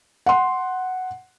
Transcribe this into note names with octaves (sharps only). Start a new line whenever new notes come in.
F#5 C6